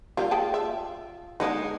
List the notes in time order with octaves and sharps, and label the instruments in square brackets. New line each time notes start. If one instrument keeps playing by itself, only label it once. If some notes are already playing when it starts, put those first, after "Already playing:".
[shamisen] G3 A3 A#3 [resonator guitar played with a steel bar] F4
[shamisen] G#4 G5 A5
E5
[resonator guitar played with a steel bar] G#3 D#4 [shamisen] B3 D4 B4